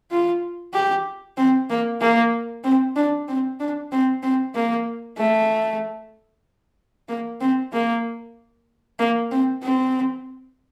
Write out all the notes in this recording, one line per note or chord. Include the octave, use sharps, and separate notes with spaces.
F4
G4
C4
A#3
A#3
C4
D4
C4
D4
C4
C4
A#3
A3
A#3
C4
A#3
A#3
C4
C4